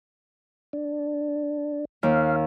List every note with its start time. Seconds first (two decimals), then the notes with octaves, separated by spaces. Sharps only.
0.73 D4
2.03 D#2 F5